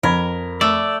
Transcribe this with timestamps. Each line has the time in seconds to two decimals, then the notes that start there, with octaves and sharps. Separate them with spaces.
0.03 F2 A#4 B5 G#6
0.61 A3 D5 E6